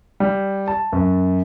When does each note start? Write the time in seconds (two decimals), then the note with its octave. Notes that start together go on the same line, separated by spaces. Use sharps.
0.20 G3
0.68 A5
0.93 F#2